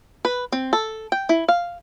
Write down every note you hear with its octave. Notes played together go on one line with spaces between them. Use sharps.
B4
C4
A4
G5
E4
F5